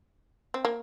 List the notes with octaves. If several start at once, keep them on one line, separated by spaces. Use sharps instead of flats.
C4
A#3